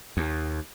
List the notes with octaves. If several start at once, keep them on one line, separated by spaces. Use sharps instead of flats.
D#2